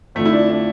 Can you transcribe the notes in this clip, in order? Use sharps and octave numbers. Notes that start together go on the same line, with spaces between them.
F2 D3 F3 A3
E4
D4
D4